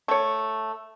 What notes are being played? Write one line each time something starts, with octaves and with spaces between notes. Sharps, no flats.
A3 C#5